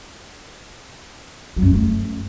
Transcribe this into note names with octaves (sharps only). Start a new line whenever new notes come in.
F#3
F#2
G#3
A3